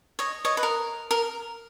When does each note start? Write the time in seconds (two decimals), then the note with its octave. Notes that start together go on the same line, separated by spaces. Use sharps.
0.19 C#5 D#5
0.45 C#5 D#5
0.57 B4
0.63 A#4
1.11 A#4